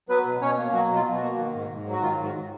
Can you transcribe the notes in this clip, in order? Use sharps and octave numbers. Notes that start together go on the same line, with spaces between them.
F#3 B3 B4
B2
B2 C#4 C#5
A#3
F#3 F#4
B2
F4
B2
A#3 F#4
D#3
G#2
G#2
F#3
F#4
D#3 F4
G#2
F#4